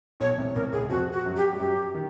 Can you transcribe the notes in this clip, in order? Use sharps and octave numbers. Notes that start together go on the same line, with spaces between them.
B1 B2 C#5
C2 C3
C2 C3 A#4
C#2 C#3 G#4
F2 F3 F#4
F#4
F#2 F#3
G4
G3
F#2 F#3 G4
D#3